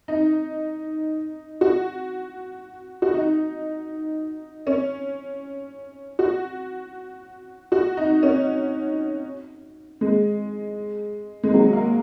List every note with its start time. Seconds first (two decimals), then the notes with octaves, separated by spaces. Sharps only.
0.08 D#4
1.61 F#4
3.02 F#4
3.14 D#4
4.67 C#4
6.19 F#4
7.72 F#4
7.97 D#4
8.23 C#4
10.01 G#3
11.43 G#3
11.54 F#3
11.73 A#3